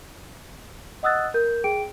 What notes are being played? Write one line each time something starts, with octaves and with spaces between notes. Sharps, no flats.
D#5 F#5 D#6 E6 F#6 A6
A#4 G6
G#4 G5 D7